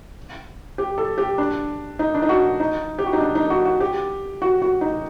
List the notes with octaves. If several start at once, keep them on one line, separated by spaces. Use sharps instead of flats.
G4
A4
G4
D4
D#4
D4
D#4
F#4
D#4
G4
F#4
D#4
D4
D#4
F#4
F#4
G4
F#4
F#4
D#4